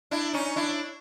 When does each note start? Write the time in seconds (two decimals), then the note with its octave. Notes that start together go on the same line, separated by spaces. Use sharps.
0.11 D4 E4
0.33 C#4 D#4
0.56 D4 E4